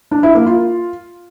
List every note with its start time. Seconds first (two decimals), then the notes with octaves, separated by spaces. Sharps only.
0.11 D4
0.23 E4
0.35 A#3
0.46 F4